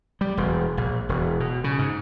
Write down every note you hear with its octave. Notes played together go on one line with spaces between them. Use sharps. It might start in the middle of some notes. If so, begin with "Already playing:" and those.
G3
E1
A#1
E1
B2
C#3
G#2